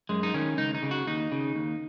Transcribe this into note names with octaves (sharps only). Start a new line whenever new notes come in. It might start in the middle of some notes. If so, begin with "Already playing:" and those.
F#2 G#3
D#4
D#3 C#4
C#2 D#4
D#4
C#3
F#4
D#2 D#4
C#3
D#2